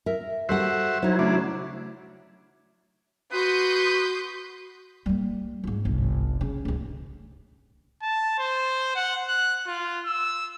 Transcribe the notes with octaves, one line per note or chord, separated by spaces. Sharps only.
A#4 E5
G3 F#4 A4 C5 E5 F#5
F#3 D#4 E4 C5
C#3 A3 D4
F#4 B4 C6 D#6 G6
G3 A#3
G#2 F3
G1 C2
C#3
C#2 G#2
A5
C5
F#5
F#6
F4
E6